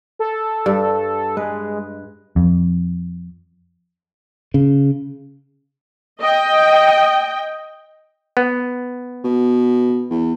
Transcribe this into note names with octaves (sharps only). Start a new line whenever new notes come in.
A4
G2
G#3 B4
F2
C#3
D#5 G5
B3
B2
E2